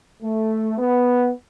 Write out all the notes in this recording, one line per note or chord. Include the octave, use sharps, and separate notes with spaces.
A3
B3